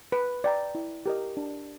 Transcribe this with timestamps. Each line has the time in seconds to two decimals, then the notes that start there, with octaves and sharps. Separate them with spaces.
0.12 B4
0.44 D5 G5 A#5
0.75 E4
1.06 G4 A#4 D#5
1.37 D4